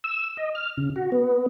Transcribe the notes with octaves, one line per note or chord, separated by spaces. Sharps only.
E6
D#5
F6
C#3
F#4
B3